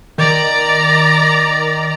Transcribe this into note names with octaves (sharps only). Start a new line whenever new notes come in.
D#3 D5 A#5